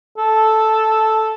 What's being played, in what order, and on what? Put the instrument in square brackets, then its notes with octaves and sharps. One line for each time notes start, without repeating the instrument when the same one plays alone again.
[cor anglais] A4